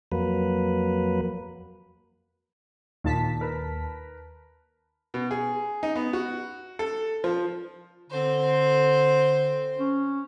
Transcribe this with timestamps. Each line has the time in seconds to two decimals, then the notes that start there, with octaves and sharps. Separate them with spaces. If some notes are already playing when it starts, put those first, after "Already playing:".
0.12 F2 F#3 A#3 B4
3.04 D#2 A#2 A5 B6
3.41 A#4 B4
5.14 B2
5.31 G#4
5.83 D#4
5.96 B3
6.13 F#4
6.79 A4
7.24 F3
8.10 D3 C4 C5
9.79 C#4